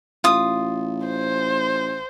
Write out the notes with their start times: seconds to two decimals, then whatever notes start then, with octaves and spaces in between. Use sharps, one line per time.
0.24 A1 F4 D#6
1.07 C5